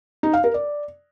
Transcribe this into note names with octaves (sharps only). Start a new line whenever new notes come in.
D#4
F5
A#4
D5